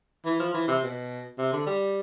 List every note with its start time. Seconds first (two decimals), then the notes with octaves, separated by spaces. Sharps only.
0.25 E3
0.39 F3
0.54 E3
0.68 C3
0.83 B2
1.38 C3
1.53 D3
1.67 G3